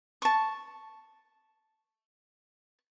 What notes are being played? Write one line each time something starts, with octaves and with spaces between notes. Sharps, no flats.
A5 C#6